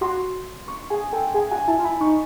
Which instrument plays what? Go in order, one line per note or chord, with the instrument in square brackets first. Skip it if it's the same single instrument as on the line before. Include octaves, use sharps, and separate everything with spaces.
[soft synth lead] F#4 [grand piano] C6
[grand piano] C#6
[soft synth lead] G#4 [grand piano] G#5
[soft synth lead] A4 [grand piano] G5
[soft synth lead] G#4 [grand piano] G#5
[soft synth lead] F#4 [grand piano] G#5
[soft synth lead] E4 [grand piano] A5
[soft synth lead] F4
[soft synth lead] E4 [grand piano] B5
[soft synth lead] D#4 [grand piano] C#6